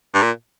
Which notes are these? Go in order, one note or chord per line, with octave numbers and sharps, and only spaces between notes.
G2
A#2